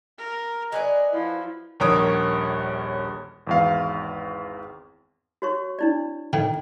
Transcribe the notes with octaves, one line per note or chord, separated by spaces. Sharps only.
A#4
F#3 B4 D5 D#5 G#5
F3 E4
D#1 A#1 A#4 C#5 D#6
G#1 E2 F5
F#4 C#5 C#6
D4 E4 D5
A2 D#3